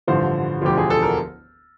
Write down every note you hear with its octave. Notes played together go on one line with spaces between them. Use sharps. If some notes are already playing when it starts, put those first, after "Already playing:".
A1 G2 D3 F3 C5
E1 D2 D3 F3 G4
G#4
A4
A#4